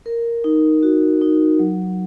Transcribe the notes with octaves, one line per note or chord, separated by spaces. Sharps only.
A#4
D#4
F#4
D#4
F#3